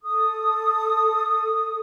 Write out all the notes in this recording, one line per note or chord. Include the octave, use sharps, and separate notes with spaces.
A4 D#6